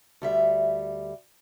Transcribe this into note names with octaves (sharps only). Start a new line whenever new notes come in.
D2 G3 E5